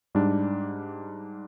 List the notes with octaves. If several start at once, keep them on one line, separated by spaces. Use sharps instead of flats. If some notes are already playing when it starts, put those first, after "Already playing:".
G#2 G3 D4